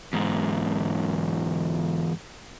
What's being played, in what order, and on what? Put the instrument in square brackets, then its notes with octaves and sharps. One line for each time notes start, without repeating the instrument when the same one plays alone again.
[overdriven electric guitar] E2 G#2